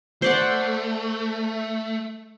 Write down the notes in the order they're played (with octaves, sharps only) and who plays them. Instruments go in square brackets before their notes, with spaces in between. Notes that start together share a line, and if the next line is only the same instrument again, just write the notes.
[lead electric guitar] A3 [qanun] C5 D5 F#5